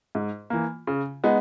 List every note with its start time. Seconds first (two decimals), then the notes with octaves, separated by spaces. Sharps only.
0.15 G#2
0.50 E3 A#3
0.87 C#3
1.24 G#3 B3 D#4